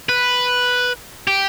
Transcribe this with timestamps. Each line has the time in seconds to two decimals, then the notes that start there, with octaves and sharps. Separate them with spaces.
0.09 B4
1.27 G4